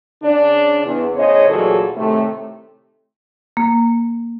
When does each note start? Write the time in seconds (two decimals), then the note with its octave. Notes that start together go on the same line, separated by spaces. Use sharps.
0.23 C#3 D4 D5
0.85 E2
1.16 A2 C#3 G#4 C5 C#5 D#5
1.48 D2 A#2 E3 F#3 G#4 A4
1.96 A2 C3 D#3 A3
3.57 A#3